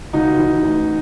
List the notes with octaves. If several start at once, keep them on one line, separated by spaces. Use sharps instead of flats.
C#2 D#4 F#4
E3
A1